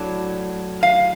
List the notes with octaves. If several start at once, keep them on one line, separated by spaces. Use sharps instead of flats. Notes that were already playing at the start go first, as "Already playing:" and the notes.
Already playing: A2 F#3 D4
F5